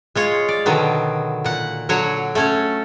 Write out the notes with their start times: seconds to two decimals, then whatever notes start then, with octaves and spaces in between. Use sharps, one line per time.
0.15 G#3 F4 C#5
0.48 D5
0.66 B2 D3 D#3 F#3 B3
1.44 A#2 F#5
1.89 D3 F#3 F#4 C#5 F#5
2.35 A3 C#4 C#5